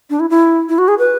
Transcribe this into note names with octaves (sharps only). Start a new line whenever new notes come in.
D4
E4
E4
E4
F#4
G#4
B4